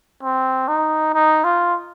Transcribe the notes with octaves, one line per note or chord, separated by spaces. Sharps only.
C4
D#4
D#4
F4